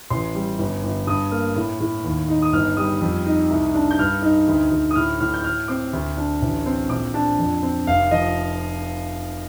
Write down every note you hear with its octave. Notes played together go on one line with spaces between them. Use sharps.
A1 C6
G3
G1
G1
G2 D#6
A#3 F6
A2
A2
D#2
D#4
D#6
G1 F6
G3 D#6
F2
D#4
C2
D4
G6
G2 F6
D#4
D2
D2
D#6
A2 F6
A2 F6
G6
A2 F6
C4 D6
D2
D4
A1
C4
A#1 D6
D4 A5
F2
C4
F1 F5
F3 D#5